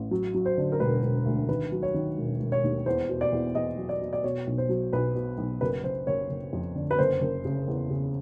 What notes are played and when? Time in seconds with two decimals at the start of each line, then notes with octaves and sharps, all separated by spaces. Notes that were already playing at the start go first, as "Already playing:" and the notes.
Already playing: A1
0.11 F#3
0.34 F#3
0.46 C5
0.58 D3
0.72 A#4
0.80 E1 B4
1.03 E1
1.26 D2
1.49 D#3 B4
1.72 F#3
1.83 C#5
1.94 D#3
2.18 E1
2.40 E1
2.52 C#5
2.64 D#2
2.86 E2 C5
3.09 B2
3.21 D5
3.32 E2
3.55 E2 D#5
3.77 F#3
3.89 D5
4.01 B2
4.13 D5
4.24 B2 C#5
4.47 B1
4.58 C5
4.69 F#3
4.93 B1 B4
5.15 B2
5.38 B1
5.61 F#1 B4
5.84 F#1 C5
6.07 F#1 C#5
6.30 F#1
6.53 F2
6.76 D3
6.91 B4
6.98 F#1 C5
7.21 F#1
7.45 C#3
7.68 E2
7.90 C#3